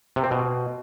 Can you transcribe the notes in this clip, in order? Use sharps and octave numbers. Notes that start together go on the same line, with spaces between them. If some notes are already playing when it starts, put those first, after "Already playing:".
C3
C4
B2